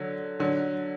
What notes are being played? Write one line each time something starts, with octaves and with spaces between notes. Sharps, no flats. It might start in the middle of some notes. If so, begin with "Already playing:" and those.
Already playing: D3 F#3
D3 F#3